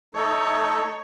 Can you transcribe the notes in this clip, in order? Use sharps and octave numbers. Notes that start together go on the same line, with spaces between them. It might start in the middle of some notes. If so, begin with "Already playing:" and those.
A3 D#4 A4 C#5